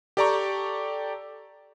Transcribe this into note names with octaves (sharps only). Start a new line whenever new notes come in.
G4 A4 D5 G5 A#5 C#6